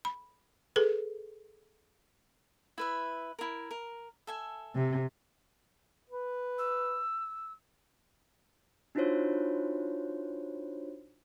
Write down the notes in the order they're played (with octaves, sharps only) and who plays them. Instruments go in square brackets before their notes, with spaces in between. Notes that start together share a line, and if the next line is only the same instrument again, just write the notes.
[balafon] B5
G#4 A4 B4
[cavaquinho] E4 B4 E5
E4 A#4
A#4
A4 E5 G#5
[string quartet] C3
[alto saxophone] B4
[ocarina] E6
[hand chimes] D4 D#4 F4 F#4 C5 C#5